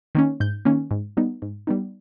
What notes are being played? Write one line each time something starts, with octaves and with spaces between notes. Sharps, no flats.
D#3 A#3 C#4
G#2 G6
D#3 A#3 C#4
G#2
G3 B3 D#4
G#2
G3 B3 D#4